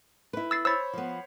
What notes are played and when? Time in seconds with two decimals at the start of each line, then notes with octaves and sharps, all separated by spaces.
0.33 E4 B4
0.51 E6 A6 C7
0.65 C5 C#5 B5 E6 A6
0.93 F3 B3